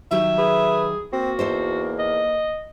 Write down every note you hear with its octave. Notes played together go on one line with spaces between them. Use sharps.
D#3 F#3 G4 E5
G#4 B4
A#3 C4 F#4
E2 D#4 A4 C5
D#5